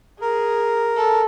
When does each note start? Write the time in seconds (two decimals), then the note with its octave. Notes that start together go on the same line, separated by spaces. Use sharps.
0.21 G#4 A#4
0.97 A4